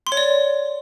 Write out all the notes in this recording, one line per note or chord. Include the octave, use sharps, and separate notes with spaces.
C6
C#5
D5